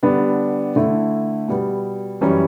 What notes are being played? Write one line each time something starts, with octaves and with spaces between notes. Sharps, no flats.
D3 G3 B3 D4
D3 A3 E4
B2 G3 B3
F#2 E3 G3 C#4